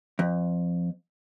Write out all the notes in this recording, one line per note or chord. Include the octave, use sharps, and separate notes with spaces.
F2